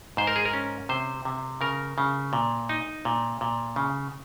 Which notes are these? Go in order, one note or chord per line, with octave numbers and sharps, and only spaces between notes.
G#2 C5
A#4
G#4
A#4
C#4
C3 C5
C3
C#3 A#4
C#3
A#2
D#4
A#2
A#2
C#3